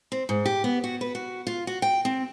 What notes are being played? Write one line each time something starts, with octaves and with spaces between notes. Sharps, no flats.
C4
G#2
G4
B3
F#4
B4
F#4
F4
F#4
G5
C4